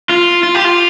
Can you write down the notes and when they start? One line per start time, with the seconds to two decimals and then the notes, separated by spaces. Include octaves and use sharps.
0.10 F4
0.43 F4
0.55 G4
0.65 F4